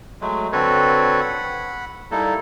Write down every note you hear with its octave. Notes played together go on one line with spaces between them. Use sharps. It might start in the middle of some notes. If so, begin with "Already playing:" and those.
F#3 G#3 A3
D3 C4 F#4 A4 B4 C#5
F#5 B5
G3 A#3 D#4 E4 A4